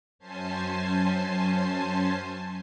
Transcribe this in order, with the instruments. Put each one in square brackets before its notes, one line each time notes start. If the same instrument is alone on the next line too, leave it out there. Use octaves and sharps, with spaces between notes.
[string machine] F#2 C#4 C5 G#5 A5 C7